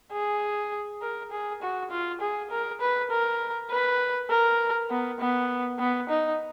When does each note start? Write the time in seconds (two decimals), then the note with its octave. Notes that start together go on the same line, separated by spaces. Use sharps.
0.12 G#4
1.02 A#4
1.31 G#4
1.62 F#4
1.91 F4
2.21 G#4
2.51 A#4
2.81 B4
3.11 A#4
3.71 B4
4.30 A#4
4.90 B3
5.20 B3
5.79 B3
6.09 D#4